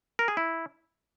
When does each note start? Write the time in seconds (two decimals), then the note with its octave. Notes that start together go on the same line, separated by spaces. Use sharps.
0.19 A#4
0.28 G#4
0.37 E4